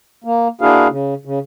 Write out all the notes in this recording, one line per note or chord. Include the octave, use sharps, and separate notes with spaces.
A#3
A#3 D4 E4 F#4 G#4 F5
C#3
C#3